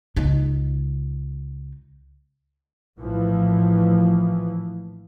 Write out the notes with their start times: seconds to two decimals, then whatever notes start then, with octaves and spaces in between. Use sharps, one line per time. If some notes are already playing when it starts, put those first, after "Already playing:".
0.16 C#2 D#4
2.99 A#1 A2 E3 F3